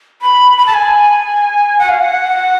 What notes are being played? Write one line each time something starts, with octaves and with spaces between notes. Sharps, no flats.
B5
B5
A5
G#5
F#5
F5
F#5